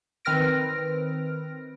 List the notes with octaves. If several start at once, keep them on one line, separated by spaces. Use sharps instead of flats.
D#3 C4 B4 F6 A#6 D7